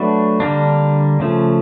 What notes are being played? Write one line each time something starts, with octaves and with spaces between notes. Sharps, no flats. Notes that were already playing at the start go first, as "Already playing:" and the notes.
Already playing: F#3 A3 D4 F#4 B4
D3 G3 A#3 D4
C#3 F3 A3